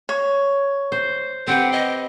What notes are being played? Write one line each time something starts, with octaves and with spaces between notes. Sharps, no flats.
C#5
C5
C4 G4 B4 F#5
D#5